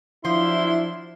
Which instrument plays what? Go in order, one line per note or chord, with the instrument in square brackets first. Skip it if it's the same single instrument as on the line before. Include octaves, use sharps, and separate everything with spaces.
[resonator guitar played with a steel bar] F3 [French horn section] F#3 D4 E4 [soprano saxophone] C6